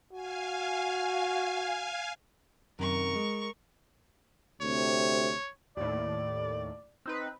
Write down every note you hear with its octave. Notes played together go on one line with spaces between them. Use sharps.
F#4 F5 G#5
F#2 C3 D#3 A#4 C#6
G#3
D2 C3 C#5
D#2 A2 D5
C4 D#4 B4